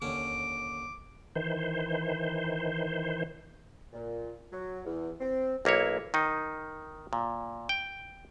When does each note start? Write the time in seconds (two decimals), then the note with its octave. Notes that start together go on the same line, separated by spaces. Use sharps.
0.02 D#2 D3 C#4 D6
1.36 D#3 E3 C5
3.93 A#2
4.52 F#3
4.85 E2
5.20 C4
5.65 B1 A#3 E4 C#5
6.14 D#3 D#4
7.13 A#2
7.69 G5